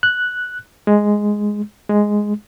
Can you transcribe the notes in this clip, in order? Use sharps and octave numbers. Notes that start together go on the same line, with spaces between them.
F#6
G#3
G#3